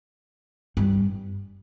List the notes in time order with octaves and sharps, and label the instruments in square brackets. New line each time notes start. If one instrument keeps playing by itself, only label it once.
[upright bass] G2